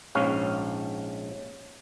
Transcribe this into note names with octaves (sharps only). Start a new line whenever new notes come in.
A#1 G#2 C#4 F5